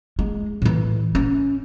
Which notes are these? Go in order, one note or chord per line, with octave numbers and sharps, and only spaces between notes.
G#3
A2 E3
C#4